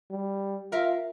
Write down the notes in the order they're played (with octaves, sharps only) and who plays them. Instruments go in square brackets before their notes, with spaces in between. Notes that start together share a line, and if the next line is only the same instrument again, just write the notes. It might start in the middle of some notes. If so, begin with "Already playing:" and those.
[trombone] G3
[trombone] F4 [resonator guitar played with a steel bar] A#4 E5 F5